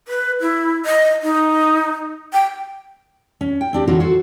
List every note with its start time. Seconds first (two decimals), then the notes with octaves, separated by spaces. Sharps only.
0.08 B4
0.41 E4
0.86 D#5
1.23 D#4
2.33 G5
3.41 C#4
3.61 G5
3.73 C4 D4 G4
3.88 D3 E3 F#3 F4 F#4
4.00 F#4 A4 C5